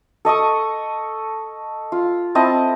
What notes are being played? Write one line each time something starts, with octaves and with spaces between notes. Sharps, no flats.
A4 D#5 C#6 D#6
F4
C4 E4 D#5 A5